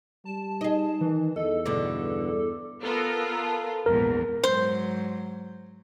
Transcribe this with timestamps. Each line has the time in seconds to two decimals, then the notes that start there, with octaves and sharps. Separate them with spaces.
0.25 G3 A5
0.61 D#4 G#4 D#5
1.01 D#3 E3
1.36 E2 A4 D#5
1.66 G2 B2 D3 D6
2.83 B3 F4 A4 A#4
3.86 A#1 E2 G#2 A#4
4.44 G#2 F#3 C5